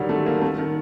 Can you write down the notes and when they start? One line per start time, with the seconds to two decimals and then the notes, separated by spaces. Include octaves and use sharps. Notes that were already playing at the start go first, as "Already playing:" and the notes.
Already playing: D3 D#3 F#3 G3
0.09 A3
0.26 A#3
0.42 A3
0.58 D#3